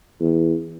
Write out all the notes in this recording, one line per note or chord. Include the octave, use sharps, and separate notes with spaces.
E2